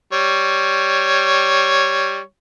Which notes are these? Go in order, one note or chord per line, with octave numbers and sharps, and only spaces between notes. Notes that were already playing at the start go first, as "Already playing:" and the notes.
G3 C#5